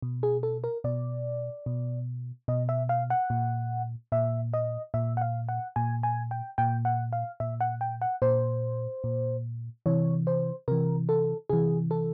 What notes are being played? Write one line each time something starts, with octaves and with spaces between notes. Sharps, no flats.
B2
G#4
A4
A#4
B2 D5
B2
B2 D#5
E5
F5
F#5
A#2
A#2 E5
D#5
A#2 E5
F#5
F5
F#5
A#2 G#5
G#5
G5
A#2 G5
F#5
F5
A#2 E5
F#5
G5
F#5
A#2 C5
A#2
C3 E3 C#5
C5
C3 E3 A#4
A4
C3 E3 G#4
A4